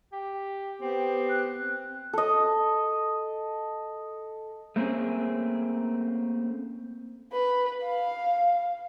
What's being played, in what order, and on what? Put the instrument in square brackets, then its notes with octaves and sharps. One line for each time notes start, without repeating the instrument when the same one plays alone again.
[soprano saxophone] G4
[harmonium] B3 G4 [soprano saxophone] C4
[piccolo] F#6
[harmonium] C4
[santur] A4 D#5
[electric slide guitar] A3 A#3 C4 C#4 G#4
[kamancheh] B4
F5